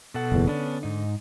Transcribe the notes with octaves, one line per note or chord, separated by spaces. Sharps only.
B2 A4 F#5
F#1 E2
D3 B3 C#4 D4
G#2 D#4